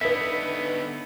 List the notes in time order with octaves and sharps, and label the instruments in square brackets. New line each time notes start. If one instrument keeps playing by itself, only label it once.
[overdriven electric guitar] D3 B3 [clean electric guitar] D#4 E4 E5 [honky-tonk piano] A4 B4